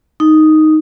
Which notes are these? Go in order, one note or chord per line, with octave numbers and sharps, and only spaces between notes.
D#4